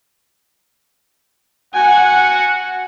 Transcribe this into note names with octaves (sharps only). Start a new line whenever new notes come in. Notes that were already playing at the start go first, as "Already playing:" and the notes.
F#4 F#5 G#5